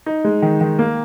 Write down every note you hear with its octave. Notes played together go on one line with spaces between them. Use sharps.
D#4
G#3
D#3
D#3
A#3